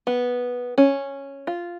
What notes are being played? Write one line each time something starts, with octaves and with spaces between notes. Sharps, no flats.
B3
C#4
F4